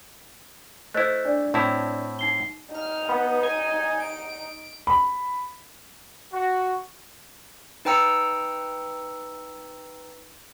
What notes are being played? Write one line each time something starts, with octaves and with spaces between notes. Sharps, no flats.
A3 E4 C5 D#5 F#6
D4 D5
A2 C4 E4
D#4 C7 G7
D#4 F6
B3
G#5
D7
B5
F#4
D#4 B4 G5 A#5 E6 C#7